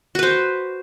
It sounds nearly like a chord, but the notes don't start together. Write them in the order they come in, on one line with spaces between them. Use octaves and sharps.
F#4 B4 C5